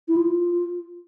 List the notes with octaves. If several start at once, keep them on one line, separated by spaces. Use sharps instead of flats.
E4
F4